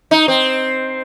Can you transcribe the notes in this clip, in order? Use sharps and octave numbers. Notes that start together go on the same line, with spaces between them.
D#4
C4